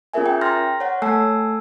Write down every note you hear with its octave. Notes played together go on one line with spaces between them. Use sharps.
C#4 F4 G#4 A#4 E5 G#5
G5
A#5 C6 F6 A6 A#6
C#5 F#5
A3 A4 G#5 A5 E6 C7